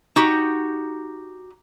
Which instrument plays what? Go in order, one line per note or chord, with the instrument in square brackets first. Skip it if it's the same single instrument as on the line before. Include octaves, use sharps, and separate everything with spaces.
[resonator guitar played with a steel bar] D#4 F#4 G4